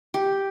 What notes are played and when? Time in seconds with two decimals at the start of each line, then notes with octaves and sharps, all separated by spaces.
0.14 G4